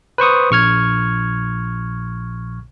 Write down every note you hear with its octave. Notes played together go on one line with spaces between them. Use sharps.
B4 C5 C#6 D#6
A#1 C#6 F6 G#6